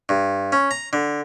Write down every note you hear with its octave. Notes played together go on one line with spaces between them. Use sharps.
G2
C#4
A#5
D3